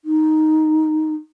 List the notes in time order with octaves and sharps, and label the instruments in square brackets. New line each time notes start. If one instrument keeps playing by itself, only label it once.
[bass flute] D#4